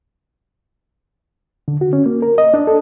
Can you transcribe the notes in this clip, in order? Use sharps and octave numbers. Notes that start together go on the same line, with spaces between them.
D3
F#4
C#4
A#3
A#4
D#5
D4
A4